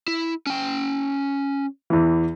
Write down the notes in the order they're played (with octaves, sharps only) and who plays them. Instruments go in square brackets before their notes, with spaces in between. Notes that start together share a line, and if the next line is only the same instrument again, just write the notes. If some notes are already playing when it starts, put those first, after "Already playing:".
[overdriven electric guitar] E4
C#4 G5
[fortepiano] E2 E3